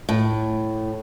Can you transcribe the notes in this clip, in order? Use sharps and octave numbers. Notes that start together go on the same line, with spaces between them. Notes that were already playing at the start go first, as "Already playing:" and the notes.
A2